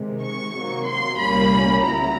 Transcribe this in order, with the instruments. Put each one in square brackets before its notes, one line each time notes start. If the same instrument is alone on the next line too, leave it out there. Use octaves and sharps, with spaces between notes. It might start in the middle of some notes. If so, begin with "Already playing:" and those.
Already playing: [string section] C3 D#3 G#3
C#6
C3 D#3 F#3 A#3
C6
C2 A#2 G3 A#3 C#4 B5
C#2 C#3 F#3 B3 E4 A#5